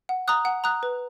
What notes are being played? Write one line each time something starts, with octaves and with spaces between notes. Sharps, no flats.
F#5
A#5 D#6 F#6
F#5
A#5 D#6 F#6
B4